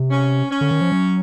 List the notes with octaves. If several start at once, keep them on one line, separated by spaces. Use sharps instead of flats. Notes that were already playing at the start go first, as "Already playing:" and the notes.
Already playing: C3
C#4
C#4
D3
D#3
F3
F#3